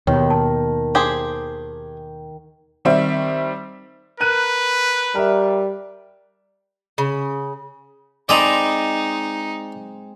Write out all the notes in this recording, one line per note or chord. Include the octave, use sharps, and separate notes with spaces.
D#2 B2 D#3 C#5
A5
G4 G#4 C5
D#3 G3 C4 E5
A#4 B4 F#6 D#7
G3 A#4 E5
C#3
G#3 C4 D#4 D5 D#5 A#5 B5